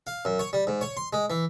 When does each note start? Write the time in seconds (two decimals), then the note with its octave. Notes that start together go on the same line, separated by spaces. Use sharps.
0.07 F5
0.25 F#2
0.39 C#5
0.53 G3
0.67 G#2
0.81 C#5
0.97 C6
1.13 G#3
1.30 E3